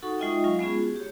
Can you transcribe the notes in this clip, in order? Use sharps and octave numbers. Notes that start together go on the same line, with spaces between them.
D#4 F#4 A4 F#5 C#6
G#3 D#4 F4 D#5 E5 G5
F#3 G#3 F4 F5 C#6
G#3 B3 C#4 F4 G#4
F#4 G#4
G4 C#5